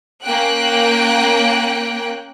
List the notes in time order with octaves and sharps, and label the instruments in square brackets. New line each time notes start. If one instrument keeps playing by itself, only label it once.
[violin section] A#3 C#4 G5 F#6